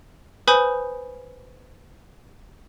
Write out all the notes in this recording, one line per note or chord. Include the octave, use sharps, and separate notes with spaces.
B4 C5 G#5 B5 D#6 G6